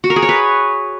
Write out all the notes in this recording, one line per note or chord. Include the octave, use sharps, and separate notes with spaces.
F#4
A#4
G#4
C#5
B4